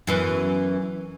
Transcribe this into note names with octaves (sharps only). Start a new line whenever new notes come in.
F#2 E3 B3